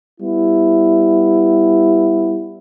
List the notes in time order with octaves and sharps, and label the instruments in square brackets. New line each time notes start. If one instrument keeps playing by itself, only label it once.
[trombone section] G3 B3 E4